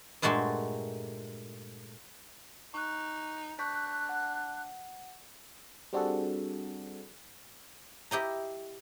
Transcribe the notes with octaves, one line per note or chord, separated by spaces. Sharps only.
G2 A#2 G#3 A3 F#4 A5
D#4 C#6 F#6
D4 C#6 F#6 G6 B6
F#5
G3 C4 D4 F#4 G#4 A4
E4 G4 D#5 A#5